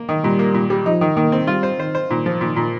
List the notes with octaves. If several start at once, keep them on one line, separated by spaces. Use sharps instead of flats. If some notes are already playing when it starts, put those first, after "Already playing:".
Already playing: A#3
D#3
A#2 G3
A#3
A#2
G3
F3 D#4
D#3
D#3 A#3
C4
G3 F4
C5
D#3 C5
C5
A#2 D#3
F3
A#2 D#3
A#2